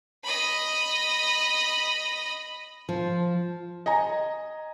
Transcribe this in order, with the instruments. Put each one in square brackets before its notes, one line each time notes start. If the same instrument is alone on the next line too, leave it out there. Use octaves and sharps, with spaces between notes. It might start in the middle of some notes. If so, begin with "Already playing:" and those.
[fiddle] D#5 B5
[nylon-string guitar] F3
[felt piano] D#5 G#5 A#5